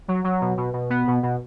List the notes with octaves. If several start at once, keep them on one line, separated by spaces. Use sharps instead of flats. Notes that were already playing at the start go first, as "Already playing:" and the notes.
F#3
F#3
B2
B2
B2
B3
B2
B2